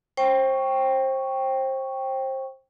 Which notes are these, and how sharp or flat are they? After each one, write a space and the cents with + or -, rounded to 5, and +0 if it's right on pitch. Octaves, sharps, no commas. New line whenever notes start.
C5 +30 G5 +0 C#6 +0